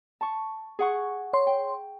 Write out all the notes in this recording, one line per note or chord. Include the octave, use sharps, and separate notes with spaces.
A5 C#6
G#4 F#5 C#6
C#5 C6
G5